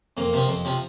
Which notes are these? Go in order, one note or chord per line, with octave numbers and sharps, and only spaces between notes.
F2 A#3
C3 F3
F2
C3 F3